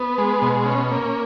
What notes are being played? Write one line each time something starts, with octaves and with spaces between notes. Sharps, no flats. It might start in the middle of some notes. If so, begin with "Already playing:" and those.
Already playing: B3
G#3
B2
C#4
A#3